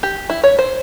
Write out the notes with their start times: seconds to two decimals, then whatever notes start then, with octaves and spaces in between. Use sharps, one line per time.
0.03 G4
0.30 E4
0.44 C#5
0.59 C5